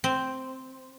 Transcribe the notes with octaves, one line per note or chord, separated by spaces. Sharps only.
C4